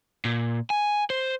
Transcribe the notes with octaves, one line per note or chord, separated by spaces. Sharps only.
A#2
G#5
C5